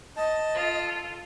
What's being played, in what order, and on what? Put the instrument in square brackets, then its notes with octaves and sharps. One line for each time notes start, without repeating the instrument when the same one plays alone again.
[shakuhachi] D#5 [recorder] A5
[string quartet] F4 A4